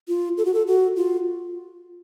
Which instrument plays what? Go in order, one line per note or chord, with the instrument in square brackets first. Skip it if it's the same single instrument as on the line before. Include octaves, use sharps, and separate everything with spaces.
[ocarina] F4
A4
F#4
A4
F#4
F4